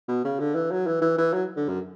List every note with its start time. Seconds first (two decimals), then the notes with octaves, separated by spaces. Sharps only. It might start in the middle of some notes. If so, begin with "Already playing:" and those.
0.08 B2
0.25 C#3
0.39 D3
0.55 E3
0.71 F#3
0.87 E3
1.02 E3
1.18 E3
1.33 F#3
1.56 D3
1.69 F#2